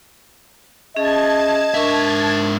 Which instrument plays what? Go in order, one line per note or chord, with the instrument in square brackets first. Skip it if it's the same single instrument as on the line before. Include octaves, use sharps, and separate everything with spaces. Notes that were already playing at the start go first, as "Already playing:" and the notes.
[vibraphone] C#4 G#4 E5 [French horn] D#5 [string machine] A5 G#6
[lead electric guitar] G#2 E5 [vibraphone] D4 A#4 C#6